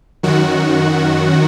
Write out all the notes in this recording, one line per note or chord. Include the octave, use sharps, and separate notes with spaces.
F#2 D#3 F#4